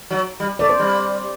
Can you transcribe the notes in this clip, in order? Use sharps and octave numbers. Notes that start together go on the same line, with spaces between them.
F#3
G3
A3 D5
C5
G3